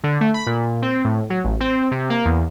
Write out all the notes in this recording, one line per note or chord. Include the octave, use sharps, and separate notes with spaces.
D3
A3
B5
A#2
C4
A2
F#3
A1
C4
C3
A#3
E2